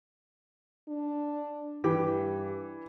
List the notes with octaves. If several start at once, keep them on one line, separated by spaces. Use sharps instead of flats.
D4
G2 E3 G4 B4